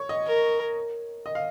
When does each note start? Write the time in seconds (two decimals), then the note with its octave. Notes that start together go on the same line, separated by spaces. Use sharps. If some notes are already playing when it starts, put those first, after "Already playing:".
Already playing: C#5
0.09 D#5
0.27 A#4
1.26 D#5
1.35 F5